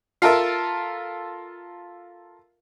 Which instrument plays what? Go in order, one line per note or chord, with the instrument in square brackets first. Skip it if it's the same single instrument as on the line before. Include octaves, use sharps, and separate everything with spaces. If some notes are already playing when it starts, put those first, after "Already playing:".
[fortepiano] F4 A4 A#4 E5